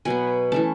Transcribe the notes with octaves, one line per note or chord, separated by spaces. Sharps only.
B2 F#3 B3 G#5
E3 A3 C#4 A5